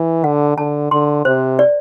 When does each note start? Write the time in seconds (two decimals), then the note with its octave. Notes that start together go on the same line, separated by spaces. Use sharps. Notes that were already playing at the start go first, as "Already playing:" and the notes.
Already playing: E3
0.24 D3 F#5
0.58 D3 A5
0.91 D3 C6
1.25 C3 C5
1.59 D5